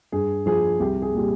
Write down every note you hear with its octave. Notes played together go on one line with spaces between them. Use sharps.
G2 G#4
F3 G#4
C2 G4
G#4
A#2 G3